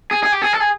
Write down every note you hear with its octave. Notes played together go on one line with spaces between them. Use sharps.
G#4
G#4
G4
G#4
A4
G#4